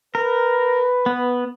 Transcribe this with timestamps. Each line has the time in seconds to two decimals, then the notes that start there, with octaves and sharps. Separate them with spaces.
0.15 A#4 B4
1.06 B3